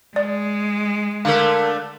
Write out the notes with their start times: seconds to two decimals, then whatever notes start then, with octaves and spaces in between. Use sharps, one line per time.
0.16 G#3 D5
1.25 D3 A3 A#4 F5